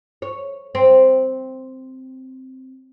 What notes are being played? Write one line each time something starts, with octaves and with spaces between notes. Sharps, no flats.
C#5
C4